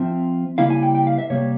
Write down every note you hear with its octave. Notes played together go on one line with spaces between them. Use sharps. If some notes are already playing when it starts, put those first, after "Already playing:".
Already playing: F3 C4 F4 E5
C#3 G3 A#3 E4 F5
G#5
G5
G5
F5
E5
C3 G3 A#3 C#5